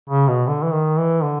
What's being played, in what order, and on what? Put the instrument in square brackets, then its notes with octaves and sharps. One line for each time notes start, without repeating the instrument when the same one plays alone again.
[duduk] C#3
B2
D3
E3
D#3
E3
D3